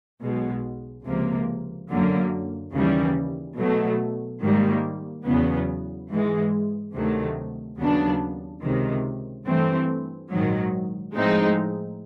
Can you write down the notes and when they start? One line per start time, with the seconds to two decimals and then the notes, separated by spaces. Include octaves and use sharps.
0.21 B1 B2 G#3
1.05 C#2 C3 F3 A#3
1.89 F#2 D3 F#3 A#3
2.73 D#2 C#3 E3 G3
3.58 B2 F#3 A3
4.42 G#2 D#3 G3 A#3
5.25 E2 C#3 F#3 B3
6.09 G#2 E3 G#3
6.94 D2 C3 D#3 F#3 A3
7.79 D#2 C#3 F#3 B3 D4
8.62 C#2 C3 D#3
9.46 G2 E3 A3 C4
10.31 A#1 G#2 D#3 F#3
11.15 A2 F3 G#3 C4 D#4